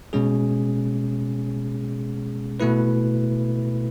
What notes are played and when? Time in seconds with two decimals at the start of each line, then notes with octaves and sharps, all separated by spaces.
0.13 B2 G#3 C#4 G#4
2.60 B2 A3 E4 B4